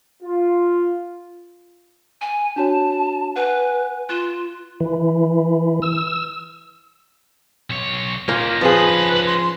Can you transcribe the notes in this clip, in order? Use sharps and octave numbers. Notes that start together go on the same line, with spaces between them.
F4
G#5
D4 F#4 C#5 A5
B4 F#5 G#5
F4 F#6 E7
E3
E6
B1 C#5
A#2 A#3 C#4 D#4
F3 F4 G#4 B4
C6